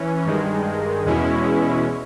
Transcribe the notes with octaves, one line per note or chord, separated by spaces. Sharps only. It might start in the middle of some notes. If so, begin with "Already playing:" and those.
Already playing: E3 C#4
G2 D#3 G#3
E2 B2 G#3 C#4 E4